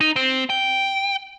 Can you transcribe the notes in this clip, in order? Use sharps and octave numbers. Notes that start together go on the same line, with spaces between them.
D#4
C4
G5